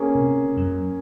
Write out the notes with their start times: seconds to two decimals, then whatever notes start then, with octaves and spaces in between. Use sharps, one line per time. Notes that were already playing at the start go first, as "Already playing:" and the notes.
Already playing: A#3 C#4 G#4
0.15 C3
0.57 F#2